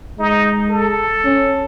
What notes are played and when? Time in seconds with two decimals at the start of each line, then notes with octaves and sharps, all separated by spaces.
0.19 G#3 D#4
0.69 A4
1.24 C#4